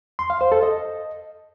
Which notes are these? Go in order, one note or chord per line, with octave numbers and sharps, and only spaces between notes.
C6
F5
C5
A4
D#5